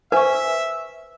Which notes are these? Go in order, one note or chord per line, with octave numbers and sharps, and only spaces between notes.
B4 C5 E5 G#5 C#6